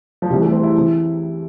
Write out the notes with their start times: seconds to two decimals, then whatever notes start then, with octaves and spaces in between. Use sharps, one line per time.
0.22 F3
0.30 C2 C3 E3 G3
0.41 A3
0.52 C4
0.63 E4
0.76 C3 E3